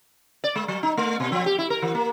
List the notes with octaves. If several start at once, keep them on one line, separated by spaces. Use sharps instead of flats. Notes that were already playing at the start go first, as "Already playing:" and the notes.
D5
G#3
F#3
D#4
A3
B2
F3
G4
E4
A#4
E3
A#3